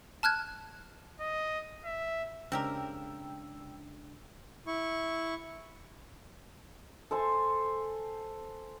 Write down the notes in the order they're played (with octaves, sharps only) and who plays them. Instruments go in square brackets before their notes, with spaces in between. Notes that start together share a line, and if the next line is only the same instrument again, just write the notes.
[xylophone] A5 F6 F#6 G#6
[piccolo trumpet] D#5
E5
[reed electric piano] C#3 G#3 D4 [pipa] C4 G4 A#4 [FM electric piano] G5 E6
[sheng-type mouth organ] E4 C#6
[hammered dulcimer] A4 C5 G#5